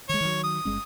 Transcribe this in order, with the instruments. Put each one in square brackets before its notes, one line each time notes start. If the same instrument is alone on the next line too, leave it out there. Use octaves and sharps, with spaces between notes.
[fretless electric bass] D#3 G#3 [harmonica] C#5
[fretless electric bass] D#3 F#3
[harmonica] D#6
[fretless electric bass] G1 G#3 C#4